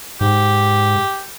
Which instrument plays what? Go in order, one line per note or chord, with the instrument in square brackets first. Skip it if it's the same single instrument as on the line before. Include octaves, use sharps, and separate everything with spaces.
[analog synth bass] G#2 [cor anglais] G4